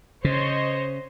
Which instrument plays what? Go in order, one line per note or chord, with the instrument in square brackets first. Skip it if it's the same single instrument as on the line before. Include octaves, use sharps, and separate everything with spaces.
[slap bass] C#3 [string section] C5 C#5 D#5